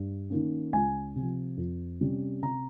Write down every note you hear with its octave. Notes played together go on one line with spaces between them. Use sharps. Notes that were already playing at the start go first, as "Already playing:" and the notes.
Already playing: G2
D#3 A#3 C#4
C#2 G#5
C3 F3
F2
C3 G3 C#4
C3 A#5